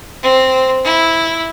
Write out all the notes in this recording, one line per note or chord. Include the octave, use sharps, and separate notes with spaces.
C4
E4